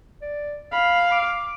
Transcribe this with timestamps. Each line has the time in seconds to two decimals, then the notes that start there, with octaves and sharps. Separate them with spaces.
0.22 D5
0.73 F5 B5
1.12 D6